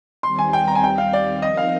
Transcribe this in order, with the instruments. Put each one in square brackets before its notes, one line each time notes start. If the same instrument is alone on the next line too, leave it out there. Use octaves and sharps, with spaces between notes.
[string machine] D#2 D#3 G3 C4 [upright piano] C6
[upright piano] G#5
G5
A#5
G#5
G5
F5
D5
[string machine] F3 C4 D#4 A#4 [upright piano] D#5
[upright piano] F5